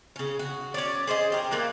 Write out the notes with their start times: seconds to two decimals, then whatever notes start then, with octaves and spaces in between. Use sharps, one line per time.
0.16 C#3 C#4
0.39 F#4
0.74 C#4 C#5 D5
1.07 G#4 C5 D5 D#5
1.32 G4 A#4
1.51 A#2 A#3 E4 F#5